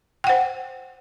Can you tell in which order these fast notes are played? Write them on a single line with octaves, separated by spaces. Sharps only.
G5 F#5 C5